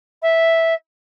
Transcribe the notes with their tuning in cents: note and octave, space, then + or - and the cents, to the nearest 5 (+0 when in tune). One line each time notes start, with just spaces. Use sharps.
E5 -5